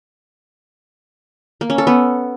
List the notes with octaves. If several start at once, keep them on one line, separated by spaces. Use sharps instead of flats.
A#3
C#4
A4
B3